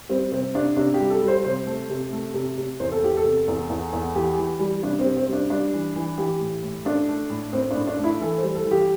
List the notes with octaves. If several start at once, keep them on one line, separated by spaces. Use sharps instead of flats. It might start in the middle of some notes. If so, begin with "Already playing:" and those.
G3 C4
C3 C4
C3 D4
C3 D4
G4
G3
A4
G3
C5
C3 C5
A3
C3
A3
C3
C3
E2 C5
A4
E2 G4
A4
C3
E2
E2
E2
E3 G4
E3
G3
C3 D4
C4
C3
C4
G3 D4
G3 D4
E3
E3
E3 G4
A2
A2
A3 D4
A3
A2
A2 C4
A2 D4
D4
A3
E4
E3 A4
G3 C5
A4
E3
G4